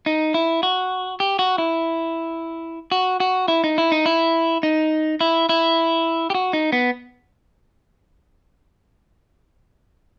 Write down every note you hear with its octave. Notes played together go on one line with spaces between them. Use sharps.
D#4
E4
F#4
G4
F#4
E4
F#4
F#4
E4
D#4
E4
D#4
E4
D#4
E4
E4
G4
F#4
D#4
B3